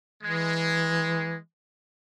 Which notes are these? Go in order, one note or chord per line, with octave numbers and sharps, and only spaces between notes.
E3 G#3